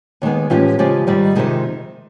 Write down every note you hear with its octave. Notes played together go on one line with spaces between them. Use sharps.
D#2 D#3 G#3 B3
A2 E3 G#3 C#4 F4 G4
C#3 F3 G#3 F4 G4
G#2 D#3 G3
F2 C3 D#3 G#3